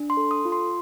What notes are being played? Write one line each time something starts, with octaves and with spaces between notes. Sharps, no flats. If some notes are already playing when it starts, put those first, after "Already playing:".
Already playing: D4
C6
A4
D#6
F4
C6